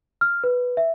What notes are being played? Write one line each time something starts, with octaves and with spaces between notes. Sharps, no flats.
F6
B4
E5